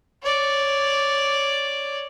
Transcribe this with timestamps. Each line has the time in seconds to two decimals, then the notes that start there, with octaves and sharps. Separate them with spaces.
0.23 C#5 D5